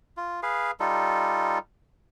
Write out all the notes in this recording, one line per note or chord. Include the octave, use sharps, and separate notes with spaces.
F4
G#4 B4 F5
G3 D#4 F4 A4